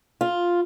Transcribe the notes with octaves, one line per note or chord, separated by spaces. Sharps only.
F4